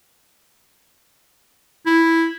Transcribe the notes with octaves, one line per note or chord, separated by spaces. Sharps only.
E4